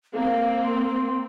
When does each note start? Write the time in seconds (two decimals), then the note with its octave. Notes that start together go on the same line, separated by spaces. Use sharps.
0.14 A#3 C4 F5
0.64 C6